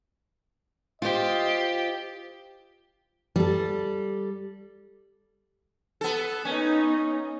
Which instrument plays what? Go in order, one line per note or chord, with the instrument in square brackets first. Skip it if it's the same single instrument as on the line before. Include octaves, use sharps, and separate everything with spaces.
[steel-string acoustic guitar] F4 C5 [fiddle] G4 [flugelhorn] D#5
[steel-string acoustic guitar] G3 A4
[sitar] B3 A4
[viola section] B3 D#4 [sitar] C#4